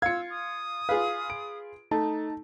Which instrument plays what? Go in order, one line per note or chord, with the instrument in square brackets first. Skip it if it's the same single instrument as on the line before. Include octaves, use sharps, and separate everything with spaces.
[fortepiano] F4 F5 [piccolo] E6 [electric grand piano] G#6 C#7
[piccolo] D#6
[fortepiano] F4 G#4 B4 [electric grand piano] F5
[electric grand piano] D7
[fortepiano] A3 [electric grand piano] D#4 A5